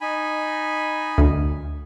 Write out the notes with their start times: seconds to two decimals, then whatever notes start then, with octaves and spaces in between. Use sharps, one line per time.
0.01 D#4 G#5 B5
1.18 D2